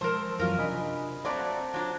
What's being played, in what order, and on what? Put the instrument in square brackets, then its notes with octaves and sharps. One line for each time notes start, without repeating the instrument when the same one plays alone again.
[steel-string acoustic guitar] F3 G#3 A5 [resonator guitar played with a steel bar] A#4 C5 [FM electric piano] C6 E6
[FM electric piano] F#2 E3 F#3 [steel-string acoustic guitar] B3 C#4 [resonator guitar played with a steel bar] F4 A#4
[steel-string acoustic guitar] C3 D4 [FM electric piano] D#5 G#5 B5
[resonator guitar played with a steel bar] F#3 A3 D5 [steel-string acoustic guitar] C4 F5 [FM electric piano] C5 A5 A#5
[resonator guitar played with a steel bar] F#3 D4 [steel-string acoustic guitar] F4